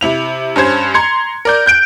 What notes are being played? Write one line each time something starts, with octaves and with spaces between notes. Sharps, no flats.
C3 E4 F7
G2 C#4 C5 G#6
A#5 C6 G#6 C#7
A#4 D5 G6
F#6 G6 D7